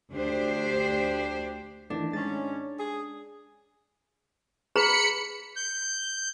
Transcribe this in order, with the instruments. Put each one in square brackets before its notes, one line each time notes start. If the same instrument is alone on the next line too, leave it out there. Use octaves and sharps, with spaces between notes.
[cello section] D2 D4 G4 C5
[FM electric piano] D#3 E3 A3 [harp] D4
[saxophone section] G#2 C#4 [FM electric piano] G#3 [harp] A6
[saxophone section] G#4
[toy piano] G#4 B4 A#5 [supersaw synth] B5 C#7
[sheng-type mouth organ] G6